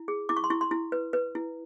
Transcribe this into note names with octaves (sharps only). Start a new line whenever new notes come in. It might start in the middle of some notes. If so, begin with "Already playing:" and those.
Already playing: E4
G#4
E4 D6
C#6
C6
E4 C#6
C6
E4
B4
B4
E4